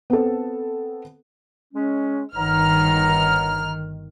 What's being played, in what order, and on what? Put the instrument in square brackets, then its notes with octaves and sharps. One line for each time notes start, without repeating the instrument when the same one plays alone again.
[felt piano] B3 C4 A4
[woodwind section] G#3 C#4
[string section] G1 D#3 F6 [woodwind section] B3 C#5 A#5